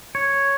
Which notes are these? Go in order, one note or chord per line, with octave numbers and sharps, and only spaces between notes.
C#5